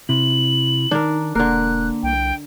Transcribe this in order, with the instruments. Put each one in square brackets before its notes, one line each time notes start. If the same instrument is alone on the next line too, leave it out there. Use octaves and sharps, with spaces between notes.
[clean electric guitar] C3 [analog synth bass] E4 [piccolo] F#7
[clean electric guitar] D#3 [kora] D4 A#4 [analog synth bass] D#4
[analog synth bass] E1 [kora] D3 A#4 [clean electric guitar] A#3 [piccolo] F#6
[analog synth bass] C2 [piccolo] G5